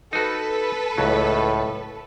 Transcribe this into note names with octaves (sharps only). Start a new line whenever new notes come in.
D#4 F#4 A4 B4
C#2 A2 F#3